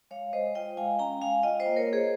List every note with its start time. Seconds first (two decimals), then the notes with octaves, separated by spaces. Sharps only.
0.11 G#3 C#5 F5
0.33 G#3 C5 D#5
0.55 F4 D#5 G5
0.77 G#3 F5 G#5
0.99 C#4 G5 A#5
1.22 G#3 F5 G#5
1.43 F4 D#5 G5
1.60 C5 D#5
1.66 A#3
1.76 A#4 C#5
1.87 A#3
1.93 G#4 C5